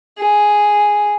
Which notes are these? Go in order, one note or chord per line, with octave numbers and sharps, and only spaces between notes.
G#4